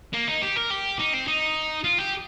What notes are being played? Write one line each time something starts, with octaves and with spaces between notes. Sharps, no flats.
A#3
D#4
G4
A#4
G4
D#4
C4
D#4
F4
G4